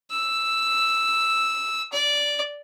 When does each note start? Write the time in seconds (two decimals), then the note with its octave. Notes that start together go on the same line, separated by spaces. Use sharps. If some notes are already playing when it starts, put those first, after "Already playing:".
0.11 E6
1.92 D5